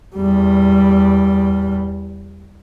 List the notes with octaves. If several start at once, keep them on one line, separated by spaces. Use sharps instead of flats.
E2 G3